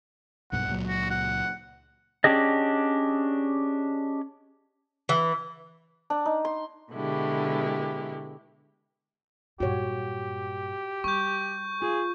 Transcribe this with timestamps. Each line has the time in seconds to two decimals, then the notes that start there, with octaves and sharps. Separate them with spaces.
0.52 B1 G2 B2 F#5
0.67 C#2 A#2 F#3
0.87 F#4
1.10 F#5
2.24 C#4 D4 G4 G#4 D#5
5.09 E3
6.10 D4
6.26 D#4
6.45 C6
6.92 B2 D3 G#3 E4 G4
9.60 G2 A#2 F#4 G4 C#5
11.04 G3 C#6 G6
11.82 F4 G#4